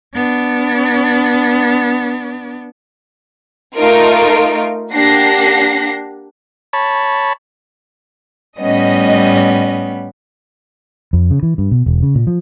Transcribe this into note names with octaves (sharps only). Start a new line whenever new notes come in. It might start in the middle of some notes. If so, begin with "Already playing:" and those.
B3 D4
A3 D#4 F4 A#4 D7
A#3 D4 G4 F#5 A#6 C7
C#5 A5 B5
A2 G3 B3 C#4 D#5
F2
C#3
E3
G2
B2
E1
C#3
A#2
F3